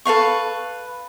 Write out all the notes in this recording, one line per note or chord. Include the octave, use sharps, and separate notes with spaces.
A4 B4 F5 C#6